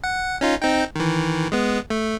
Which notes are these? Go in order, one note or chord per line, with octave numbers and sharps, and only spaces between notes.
F#5
C#4 D#4 F4
C4 D#4 G5
D#3 E3
G#3 B3
A3